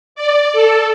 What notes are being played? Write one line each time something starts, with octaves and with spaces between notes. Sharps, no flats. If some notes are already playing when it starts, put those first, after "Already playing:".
D5
A4